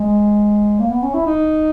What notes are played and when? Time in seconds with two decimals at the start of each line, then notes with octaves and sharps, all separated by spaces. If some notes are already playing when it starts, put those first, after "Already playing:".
Already playing: G#3
0.80 A#3
0.90 B3
1.03 C#4
1.14 E4
1.26 D#4